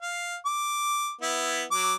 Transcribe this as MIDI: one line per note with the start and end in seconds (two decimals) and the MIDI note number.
0.02 0.37 77
0.45 1.13 86
1.22 1.64 59
1.22 1.64 64
1.72 1.94 54
1.72 1.94 86